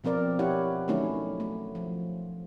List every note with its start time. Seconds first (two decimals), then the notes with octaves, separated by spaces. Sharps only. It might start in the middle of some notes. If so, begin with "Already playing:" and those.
0.04 B2 F3 C4 A#4 D5
0.39 E4 G4 C#5 F#5
0.88 D#3 F#3 A3 C#4 E4
1.40 A3
1.75 F3